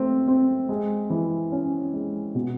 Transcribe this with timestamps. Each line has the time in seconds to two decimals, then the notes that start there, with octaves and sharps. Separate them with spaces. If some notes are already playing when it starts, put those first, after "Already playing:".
Already playing: A3 C4
0.28 C4
0.69 G#3
1.10 E3
1.52 C#4
1.93 G#3
2.35 B2